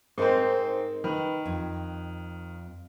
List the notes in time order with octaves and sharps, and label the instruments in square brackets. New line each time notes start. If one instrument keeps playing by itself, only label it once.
[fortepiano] G#2 C4 [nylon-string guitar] D#4 A#4 C5
[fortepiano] D#3 [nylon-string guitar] B4
[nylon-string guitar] F2